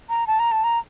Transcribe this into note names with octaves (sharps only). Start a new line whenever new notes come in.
A#5
A5
A#5
A5
A#5